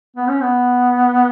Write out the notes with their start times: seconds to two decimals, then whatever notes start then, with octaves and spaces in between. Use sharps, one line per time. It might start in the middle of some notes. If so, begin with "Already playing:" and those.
0.16 B3
0.29 C#4
0.42 B3